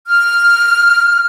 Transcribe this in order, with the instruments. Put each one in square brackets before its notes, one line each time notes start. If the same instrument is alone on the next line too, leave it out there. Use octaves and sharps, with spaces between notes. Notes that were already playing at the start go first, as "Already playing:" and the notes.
[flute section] F6